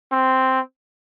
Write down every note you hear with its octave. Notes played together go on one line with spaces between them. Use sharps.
C4